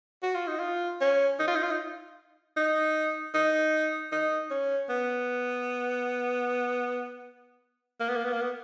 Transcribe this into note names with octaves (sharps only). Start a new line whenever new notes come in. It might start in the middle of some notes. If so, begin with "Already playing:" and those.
F#4
F4
D#4
F4
C#4
D#4
F4
D#4
F4
D#4
D#4
D#4
D#4
C#4
B3
A#3
B3
A#3
B3
A#3
B3